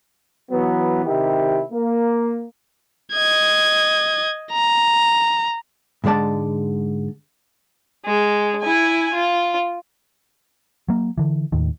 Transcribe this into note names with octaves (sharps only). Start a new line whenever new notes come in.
E3 F#3 B3
C3 D#3 E4 G4
A#3
D#5 G#6
A#5
G#2 D3 G#3 D5 A5
G#3
E4 G#5
F4
F#3 A#3
D3 E3
D#2 A2 D#3